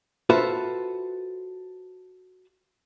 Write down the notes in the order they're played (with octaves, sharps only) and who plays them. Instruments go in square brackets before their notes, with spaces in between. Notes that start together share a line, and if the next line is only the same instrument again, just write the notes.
[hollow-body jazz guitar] F4 F#4 A4 B4 C5 E5